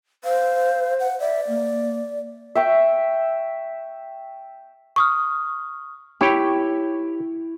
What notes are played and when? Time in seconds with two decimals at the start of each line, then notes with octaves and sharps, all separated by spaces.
0.24 C5 F5
1.00 F#5
1.20 D5 E5
1.48 A#3
2.55 E5 G5 C#6
4.96 C#6 D#6 F6
6.21 E4 G4 C#5 G5